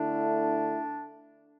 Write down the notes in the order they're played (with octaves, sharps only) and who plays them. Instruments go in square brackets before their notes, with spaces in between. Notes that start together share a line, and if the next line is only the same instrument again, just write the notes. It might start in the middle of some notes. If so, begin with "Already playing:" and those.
Already playing: [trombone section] D3 A3 E4 [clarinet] D4